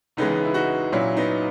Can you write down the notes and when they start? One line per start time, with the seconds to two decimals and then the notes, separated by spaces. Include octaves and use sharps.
0.17 C#2 C#3 E3 G#3 B3 D#4
0.45 E4
0.54 D#4 F#4
0.92 A#2 F#3 C#4 E4
1.17 B3 D#4